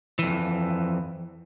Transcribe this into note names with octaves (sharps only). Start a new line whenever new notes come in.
F2 E3